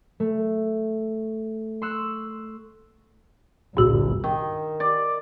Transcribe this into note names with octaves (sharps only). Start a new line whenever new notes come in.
A3
C6 C#6 E6 F#6
G1 C2 A#2 F#4 E6
D#3
D5